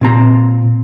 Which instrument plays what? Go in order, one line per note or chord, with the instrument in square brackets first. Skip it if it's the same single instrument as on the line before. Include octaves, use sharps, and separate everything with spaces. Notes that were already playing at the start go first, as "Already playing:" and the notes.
[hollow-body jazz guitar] A#2 C4 A#5